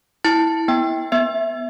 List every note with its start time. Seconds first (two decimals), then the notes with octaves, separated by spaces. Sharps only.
0.24 E4 A5
0.68 B3 G5
1.12 B3 E5